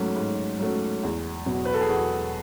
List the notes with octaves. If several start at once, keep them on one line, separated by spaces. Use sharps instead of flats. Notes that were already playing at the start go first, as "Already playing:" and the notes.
Already playing: G#2 F#3 A3 C#4
G#2
F#3 A3 C#4
E2
B2 F#3 B3
B4
A4
G#4
E2 F#4